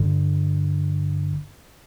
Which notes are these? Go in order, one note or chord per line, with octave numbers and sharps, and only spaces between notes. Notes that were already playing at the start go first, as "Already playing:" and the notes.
Already playing: G1 G2 D3